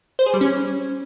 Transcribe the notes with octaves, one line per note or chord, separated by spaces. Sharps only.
C5
G#4
G3
C#4